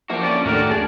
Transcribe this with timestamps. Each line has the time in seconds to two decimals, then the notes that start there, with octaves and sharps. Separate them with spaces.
0.10 F3 A#3 E4 F#4 G4
0.23 D3 C#4 D5
0.46 D#2 A2 A3 D4 F#4 G4 A#4
0.71 G#4 A5